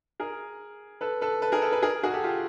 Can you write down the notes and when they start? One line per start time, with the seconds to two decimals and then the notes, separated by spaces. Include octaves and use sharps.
0.20 G#4 A#4
1.01 A4 B4
1.21 A4 B4
1.42 A4 B4
1.52 G#4 A#4
1.62 A4 B4
1.72 A4 B4
1.83 G#4 A#4
2.03 F#4 G#4
2.14 G4 A4
2.24 F4 G4